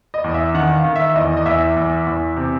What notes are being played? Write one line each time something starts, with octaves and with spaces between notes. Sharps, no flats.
D#5
E2
E5
D#3 F#5
F5
D#3
E5
E5
E2 D#5
D#5
E2 E5
E2
E2
C3